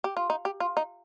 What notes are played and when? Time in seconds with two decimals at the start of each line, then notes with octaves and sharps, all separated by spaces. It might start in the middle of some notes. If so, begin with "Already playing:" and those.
0.04 G4
0.17 F4
0.30 D#4
0.45 G4
0.60 F4
0.77 D#4